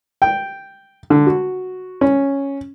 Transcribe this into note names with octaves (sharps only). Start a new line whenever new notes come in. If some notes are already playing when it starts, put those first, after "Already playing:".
G5
D3
F#4
C#4